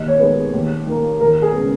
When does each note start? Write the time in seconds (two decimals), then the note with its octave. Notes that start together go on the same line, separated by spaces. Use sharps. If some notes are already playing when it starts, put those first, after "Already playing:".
Already playing: D#2 D#5
0.08 C#5
0.19 D#3 G#3 B3
0.53 D#2
0.87 D#3 A#3
1.21 D#2 A#4
1.42 G#4
1.54 C#3 G#3 B3